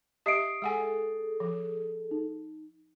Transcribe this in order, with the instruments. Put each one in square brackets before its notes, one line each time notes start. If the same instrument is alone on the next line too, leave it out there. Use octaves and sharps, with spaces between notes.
[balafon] G4 D#5 E5 [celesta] D#6 C7 D7
[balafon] G#3 F#5 G#5 [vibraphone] G#4 A4
[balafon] F3
[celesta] D#4